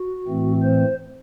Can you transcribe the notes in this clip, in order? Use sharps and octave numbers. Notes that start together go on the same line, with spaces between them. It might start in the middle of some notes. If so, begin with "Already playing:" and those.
Already playing: F#4
A2 E3 A3 C4
C5